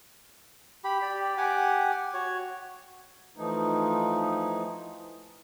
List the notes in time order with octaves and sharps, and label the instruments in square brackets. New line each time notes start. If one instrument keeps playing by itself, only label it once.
[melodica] G4 B5
G4 D5
G4 F#5 G#5 D6
F#4 C#5
[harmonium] E3 F3 A3 D#4